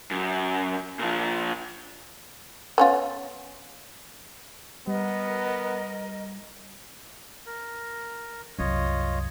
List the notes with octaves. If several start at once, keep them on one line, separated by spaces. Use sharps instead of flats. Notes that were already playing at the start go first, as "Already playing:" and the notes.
F#2
A#2 F3
B3 C#4 F4
G3 B3 A#4 D#5
A#4
C2 F#2 F4 C#5 D#5